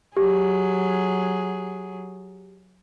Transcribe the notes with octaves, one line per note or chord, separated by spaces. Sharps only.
F#3 G4 G#4